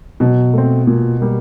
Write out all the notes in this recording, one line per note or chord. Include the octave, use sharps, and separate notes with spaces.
B2 F#3
A3 C4
A#2
G3 A#3